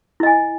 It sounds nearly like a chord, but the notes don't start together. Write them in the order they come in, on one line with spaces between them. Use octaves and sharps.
E4 D#5 G#5